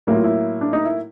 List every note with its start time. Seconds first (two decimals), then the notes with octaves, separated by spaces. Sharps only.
0.07 A2 F#3 A#3 E4
0.16 F4
0.24 E4
0.61 D4
0.73 D#4
0.85 E4